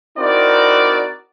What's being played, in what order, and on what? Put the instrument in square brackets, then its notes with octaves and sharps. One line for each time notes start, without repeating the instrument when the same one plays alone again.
[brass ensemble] C4 D#4 E4 F#4 A#4 D5